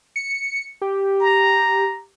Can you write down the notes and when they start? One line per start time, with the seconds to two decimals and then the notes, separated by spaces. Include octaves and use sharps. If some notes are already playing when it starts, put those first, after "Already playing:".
0.16 C#7
0.82 G4
1.21 A#5